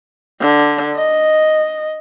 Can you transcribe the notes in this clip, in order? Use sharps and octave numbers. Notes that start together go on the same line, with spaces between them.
D3
D#5